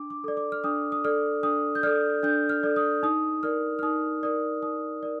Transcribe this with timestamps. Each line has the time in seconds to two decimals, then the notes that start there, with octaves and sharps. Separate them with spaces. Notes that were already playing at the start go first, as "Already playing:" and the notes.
Already playing: D4 D6
0.10 D6
0.24 A4 D5
0.37 D6
0.52 F6
0.64 D4 D#6
0.92 D#6
1.04 A4 D5 F6
1.43 D4 D#6
1.75 G6
1.83 A4 D5 F6
2.23 D4 G6
2.49 F6
2.63 A4 D5
2.76 D#6
3.03 D#4 D#6
3.43 A#4 D5 F6
3.79 F6
3.83 D#4 D#6
4.23 A#4 D5 D#6
4.63 D#4 D#6
5.03 A#4 D5